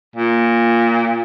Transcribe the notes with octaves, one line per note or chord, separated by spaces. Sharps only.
A#2